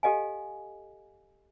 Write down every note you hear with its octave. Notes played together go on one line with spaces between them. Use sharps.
G4 A4 D#5 F5 G#5